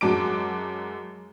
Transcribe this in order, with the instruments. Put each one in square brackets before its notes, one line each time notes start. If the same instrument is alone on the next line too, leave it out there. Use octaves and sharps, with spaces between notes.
[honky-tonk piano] F#2 G#3 F#4 A5 D6 D7